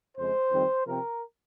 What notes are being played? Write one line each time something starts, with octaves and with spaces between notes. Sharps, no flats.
F2 C#3 G#3 C5
F2 D#3 G3 C4
C3 F3 C4 A#4